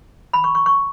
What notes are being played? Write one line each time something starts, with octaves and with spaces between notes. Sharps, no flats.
B5
C#6
C#6
C#6